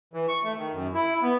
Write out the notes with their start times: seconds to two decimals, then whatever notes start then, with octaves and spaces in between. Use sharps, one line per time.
0.14 E3
0.28 C#6
0.44 A3
0.57 D#3
0.72 F#2
0.94 E4
1.22 B3